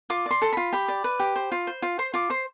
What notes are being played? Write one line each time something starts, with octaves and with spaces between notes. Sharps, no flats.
F4 D6
D5 C6
A4
F4 B5
G4 B5
D5
B4
G4
C5
F4
C5
F4
C5 C6
F4 D6
C5 C6